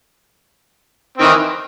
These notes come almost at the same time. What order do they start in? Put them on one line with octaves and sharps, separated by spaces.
C4 D#3 E3